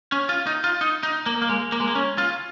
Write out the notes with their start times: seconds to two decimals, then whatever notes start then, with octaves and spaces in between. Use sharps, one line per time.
0.12 C#4
0.29 F4
0.47 D#4
0.64 F4
0.81 D#4
1.03 D#4
1.26 A#3
1.42 A#3
1.49 G#3
1.72 A#3
1.80 G#3
1.87 A#3
1.95 C#4
2.18 F4